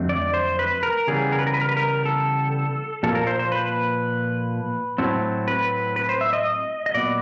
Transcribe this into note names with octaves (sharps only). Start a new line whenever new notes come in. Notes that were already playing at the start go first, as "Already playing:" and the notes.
Already playing: F2 D3 F#3 A3 C4
D5
C5
B4
A#4
C#3 E3 G3 B3 G#4
A#4
B4
A#4
B4
A#4
B4
A#4
A4
A#2 F3 A#3 A4
A#4
C5
C5
B4
A2 F#3 A3 C4
B4
B4
C5
E5
D#5
D#5
A#2 F#3 B3 D5